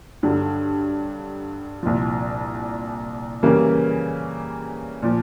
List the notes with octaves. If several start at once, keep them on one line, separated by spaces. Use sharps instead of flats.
G2 D3 F#3
C2 A#2 F3
C#3 E3 G3 A#3 C#4
A#2 F3